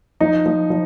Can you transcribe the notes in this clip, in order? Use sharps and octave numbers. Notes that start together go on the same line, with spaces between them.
F3 D#4
F3
F3